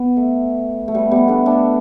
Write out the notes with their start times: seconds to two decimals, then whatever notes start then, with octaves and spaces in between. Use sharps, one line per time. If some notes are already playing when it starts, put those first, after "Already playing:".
Already playing: B3
0.17 A3
0.88 A3
0.94 G3 B3
1.11 G3 B3
1.28 A3 D4
1.46 A3 D4